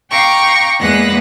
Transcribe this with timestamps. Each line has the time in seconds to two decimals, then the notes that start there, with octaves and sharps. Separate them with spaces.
0.11 F5 G5 A#5 C#6 D6
0.79 E2 G#3 A#3 B4 F#5 A#6